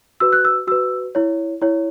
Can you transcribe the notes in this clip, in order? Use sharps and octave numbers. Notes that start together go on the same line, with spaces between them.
F#4 B4 E6
F#6
E6
F#4 B4 E6
E4 C#5
E4 C#5